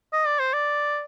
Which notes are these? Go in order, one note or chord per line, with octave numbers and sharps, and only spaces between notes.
D#5
D5
C5
D5